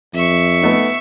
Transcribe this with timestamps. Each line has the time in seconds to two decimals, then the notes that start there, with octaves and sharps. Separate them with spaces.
0.14 F2 E5 C#6
0.62 A3 B3 D#4